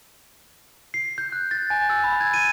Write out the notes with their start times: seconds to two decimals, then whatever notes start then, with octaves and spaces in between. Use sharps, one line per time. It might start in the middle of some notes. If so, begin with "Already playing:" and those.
0.94 C7
1.18 G6
1.32 F#6
1.51 A6
1.70 G#5
1.90 E6
2.04 B5
2.20 G#6
2.34 D#7